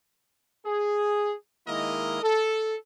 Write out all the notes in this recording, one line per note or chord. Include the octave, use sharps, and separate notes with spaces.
G#4
D#3 G#3 A#3 E4 A#4 D#5
A4